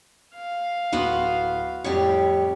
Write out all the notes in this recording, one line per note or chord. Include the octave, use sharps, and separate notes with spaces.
F5
D1 B3 F#4 B4 C6
F2 A2 G3 G4 C#5